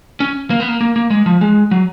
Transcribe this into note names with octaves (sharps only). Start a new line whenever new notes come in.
C#4
A#3
B3
A#3
A#3
A#3
G#3
F3
G#3
F#3